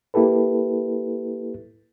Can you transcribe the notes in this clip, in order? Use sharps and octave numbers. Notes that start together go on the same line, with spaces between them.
A#3 E4 G4 A4 B4